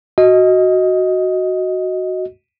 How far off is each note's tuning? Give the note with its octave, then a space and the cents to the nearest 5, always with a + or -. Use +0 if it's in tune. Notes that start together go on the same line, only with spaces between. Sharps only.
F#4 +0 D#5 +10